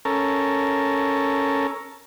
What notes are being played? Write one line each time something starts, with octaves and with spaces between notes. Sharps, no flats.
C#4 A4 A#4